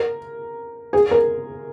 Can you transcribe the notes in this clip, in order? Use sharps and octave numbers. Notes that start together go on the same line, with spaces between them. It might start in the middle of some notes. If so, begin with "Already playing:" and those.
Already playing: A#4
G#4
A#4